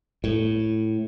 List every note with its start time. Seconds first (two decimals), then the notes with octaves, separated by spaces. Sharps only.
0.24 A2